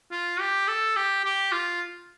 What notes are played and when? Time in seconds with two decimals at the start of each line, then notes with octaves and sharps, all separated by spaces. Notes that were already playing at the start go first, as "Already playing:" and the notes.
0.11 F4
0.40 G4
0.68 A4
0.96 G4
1.24 G4
1.52 F4